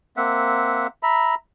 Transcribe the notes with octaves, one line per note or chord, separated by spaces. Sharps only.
A#3 C4 E5 F#5
E5 A#5 B5